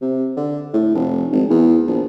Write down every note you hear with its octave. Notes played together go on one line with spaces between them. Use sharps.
C3
D3
A2
F1
G#1
E2
A#1